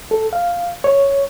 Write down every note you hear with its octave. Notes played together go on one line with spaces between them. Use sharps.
A4
F5
C#5